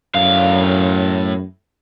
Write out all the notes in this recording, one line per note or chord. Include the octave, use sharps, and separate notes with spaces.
F#2 A2 F5